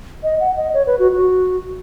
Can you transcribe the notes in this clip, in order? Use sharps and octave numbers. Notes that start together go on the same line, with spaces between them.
D#5
F#5
D#5
C#5
B4
F#4
F#4